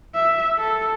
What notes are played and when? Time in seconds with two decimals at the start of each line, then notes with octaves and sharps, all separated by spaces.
0.15 E5
0.58 A4